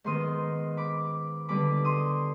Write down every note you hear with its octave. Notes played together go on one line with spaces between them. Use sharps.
G#2 D#3 B3 C6 D#6
B5 D6
D3 G3 B3 B5 D6
C6 D#6